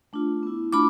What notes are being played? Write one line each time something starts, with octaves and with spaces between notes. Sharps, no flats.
A3 D4 F4
B3 E4
A3 D4 F4 B5 D6